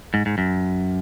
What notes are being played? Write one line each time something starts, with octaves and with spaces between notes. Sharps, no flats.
G#2
G#2
F#2